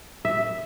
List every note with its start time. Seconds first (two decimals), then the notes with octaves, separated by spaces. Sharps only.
0.25 E5